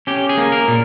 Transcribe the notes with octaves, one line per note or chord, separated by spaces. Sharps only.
C#4 G4
G#4
A#3
A#4
A#2